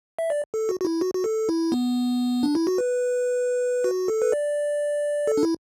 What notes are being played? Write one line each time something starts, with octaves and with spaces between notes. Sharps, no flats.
E5
D5
A4
F#4
F#4
E4
F#4
F#4
A4
E4
B3
D4
E4
F#4
B4
F#4
A4
B4
D5
A4
D4
E4